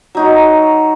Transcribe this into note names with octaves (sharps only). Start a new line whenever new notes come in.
F#3 D#4 F#4